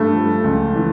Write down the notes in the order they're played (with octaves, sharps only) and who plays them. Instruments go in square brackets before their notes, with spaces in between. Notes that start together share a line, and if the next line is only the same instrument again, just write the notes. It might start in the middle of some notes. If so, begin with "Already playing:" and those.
Already playing: [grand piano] G2 A3
F3
C#2
E3